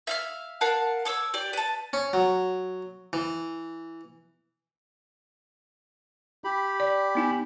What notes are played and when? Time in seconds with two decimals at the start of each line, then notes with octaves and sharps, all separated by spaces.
0.07 E5 F5 F6
0.61 A#4 F5 F#5 A5
1.05 C#5 D6 E6
1.34 G4 D5
1.53 B4 A5
1.93 C#4
2.13 F#3
3.13 E3
6.44 G4 B5
6.80 D5
7.15 B3 D#4 G#5